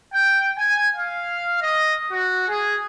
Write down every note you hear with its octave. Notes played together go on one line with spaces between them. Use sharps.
G5
G#5
F5
D#5
F#4
G#4